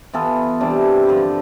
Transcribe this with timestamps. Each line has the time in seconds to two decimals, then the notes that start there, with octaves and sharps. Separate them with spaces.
0.13 E3 B3 F4 A4
0.61 C3 E3 G3 D4
1.07 G2 D3 F3